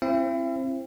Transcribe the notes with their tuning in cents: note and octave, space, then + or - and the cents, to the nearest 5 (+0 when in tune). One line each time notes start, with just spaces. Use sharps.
C4 +20 E4 +25 E5 +40